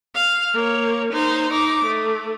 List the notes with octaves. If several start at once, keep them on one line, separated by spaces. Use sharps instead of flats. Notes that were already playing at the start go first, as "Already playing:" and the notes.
F5
A#3 C#5
D#4 C5
D#4 D6
A3